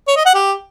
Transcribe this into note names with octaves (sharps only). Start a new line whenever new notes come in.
C#5
D#5
F#5
G4